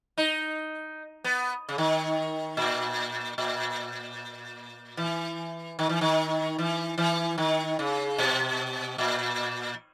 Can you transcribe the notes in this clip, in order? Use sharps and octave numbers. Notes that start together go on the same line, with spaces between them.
D#4
B3
C#3
D#3
A#2
A#2
E3
D#3
E3
D#3
E3
E3
D#3
C#3
B2
A#2